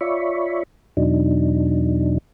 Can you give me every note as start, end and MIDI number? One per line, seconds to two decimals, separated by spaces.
0.01 0.63 65
0.01 0.63 73
0.01 0.63 74
0.01 0.63 76
0.01 0.63 83
0.01 0.63 85
0.97 2.18 40
0.97 2.18 47
0.97 2.18 54
0.97 2.18 62
0.97 2.18 63